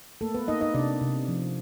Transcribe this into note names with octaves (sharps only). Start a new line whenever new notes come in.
A3 A#3 A4
B3 B4
A#3 D#4 D#5
D#4 D#5
C3 D4 D5
C3
F3